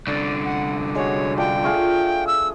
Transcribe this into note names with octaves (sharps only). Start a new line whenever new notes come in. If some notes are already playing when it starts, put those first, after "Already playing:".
C2 D3 D5
F#5
G#3 F#4 C#5
D4 F4 G5
A3 F4 G#4
E6